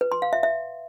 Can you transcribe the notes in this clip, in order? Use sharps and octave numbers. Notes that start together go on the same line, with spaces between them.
B4
C6
F5
E5
E5